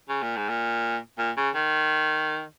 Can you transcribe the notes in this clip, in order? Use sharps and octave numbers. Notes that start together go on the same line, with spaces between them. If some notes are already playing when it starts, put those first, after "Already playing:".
C#3
A#2
G#2
A#2
A#2
C#3
D#3